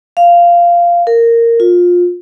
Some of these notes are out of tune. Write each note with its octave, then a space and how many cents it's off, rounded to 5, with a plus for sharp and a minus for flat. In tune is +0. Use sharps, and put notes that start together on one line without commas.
F5 -10
A#4 -10
F4 +20